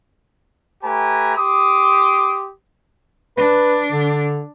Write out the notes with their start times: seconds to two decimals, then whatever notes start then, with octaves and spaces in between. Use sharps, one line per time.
0.84 A3 G4 B4 G#5 A#5
1.36 G4 C6 D6 D#6
3.37 D4 B4
3.91 D3